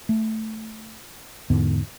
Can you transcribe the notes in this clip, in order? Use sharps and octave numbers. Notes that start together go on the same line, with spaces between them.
A3
E2 G#2 D3 B3